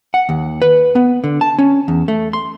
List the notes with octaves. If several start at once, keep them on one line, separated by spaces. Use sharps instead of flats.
F#5
D#2
B4
B3
D3
A5
C#4
E2
A3
C6